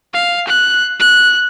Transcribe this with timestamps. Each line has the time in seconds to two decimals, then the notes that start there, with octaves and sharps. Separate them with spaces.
0.14 F5
0.47 F#6
1.00 F#6